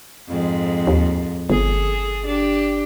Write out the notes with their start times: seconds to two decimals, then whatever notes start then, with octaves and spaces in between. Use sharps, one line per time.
0.29 F2 G#2
0.87 D#2
1.50 G1 G#4 A4
2.26 D4 G4